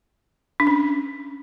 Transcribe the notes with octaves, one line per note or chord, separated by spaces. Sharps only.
D4
C#4